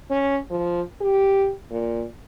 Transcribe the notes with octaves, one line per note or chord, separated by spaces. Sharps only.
C#4
F3
G4
A#2